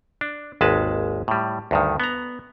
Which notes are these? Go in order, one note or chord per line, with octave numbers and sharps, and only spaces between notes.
D4
G#1 D#2 G#3 B4 A5
A2 G3
D2 G2 D#3
B3 A#5